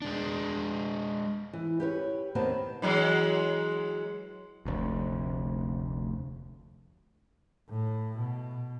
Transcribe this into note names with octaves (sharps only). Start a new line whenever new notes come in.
G#3 D4
E3
G4 B4 C#5
D#2 D#3 B3 C4 C5 A5
E3 F#3 G#3
F1 D2
A2
B2